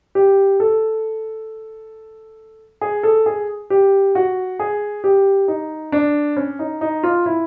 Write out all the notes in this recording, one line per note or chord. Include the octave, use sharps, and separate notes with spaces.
G4
A4
G#4
A4
G#4
G4
F#4
G#4
G4
D#4
D4
C#4
D#4
D#4
F4
E4